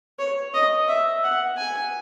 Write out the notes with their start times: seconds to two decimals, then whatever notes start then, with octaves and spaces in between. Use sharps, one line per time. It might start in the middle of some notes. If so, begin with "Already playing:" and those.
0.19 C#5
0.54 D#5
0.88 E5
1.24 F#5
1.57 G#5